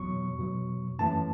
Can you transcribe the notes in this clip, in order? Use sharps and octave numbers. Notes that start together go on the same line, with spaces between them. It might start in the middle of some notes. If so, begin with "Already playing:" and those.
Already playing: E2 B2 F#3 C#6
E2 B2 F#3
F#2 E3 A3 C#4 A5